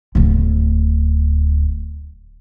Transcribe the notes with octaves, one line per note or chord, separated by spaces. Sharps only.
D1 D2